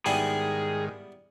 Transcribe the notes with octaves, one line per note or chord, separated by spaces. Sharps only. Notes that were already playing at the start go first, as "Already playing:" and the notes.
G#2 D#3 G3 B3 E4 G#4 G5 G#5